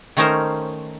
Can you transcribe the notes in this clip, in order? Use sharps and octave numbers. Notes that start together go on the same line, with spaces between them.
D#3 A3 C#4 D#4 A#4 C5